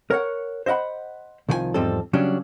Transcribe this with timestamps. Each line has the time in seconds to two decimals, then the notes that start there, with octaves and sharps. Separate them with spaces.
0.10 A#4 C#5 F#5
0.66 C5 D#5 E5 F#5 B5
1.49 C2 D#3 F3 G#4 G#5
1.74 E2 G#2 F3 G3 C4 A4
2.13 C#3 F#3 G3 C#4 D4